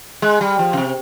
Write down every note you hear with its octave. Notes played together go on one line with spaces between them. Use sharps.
G#3
G3
F3
C#3
C3